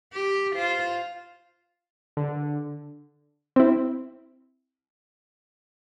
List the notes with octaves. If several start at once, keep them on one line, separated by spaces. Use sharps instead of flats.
G4
F4 C5
D3
C4 E4